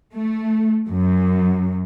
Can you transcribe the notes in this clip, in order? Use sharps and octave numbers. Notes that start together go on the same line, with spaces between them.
A3
F#2